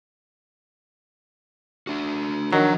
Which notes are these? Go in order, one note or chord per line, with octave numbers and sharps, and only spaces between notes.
D4 F#4
D#3 F3 F#3 D4 A#5